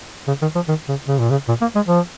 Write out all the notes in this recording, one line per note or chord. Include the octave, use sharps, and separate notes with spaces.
C#3
D#3
F3
D#3
C#3
C#3
A#2
C#3
A#2
A#3
G#3
F3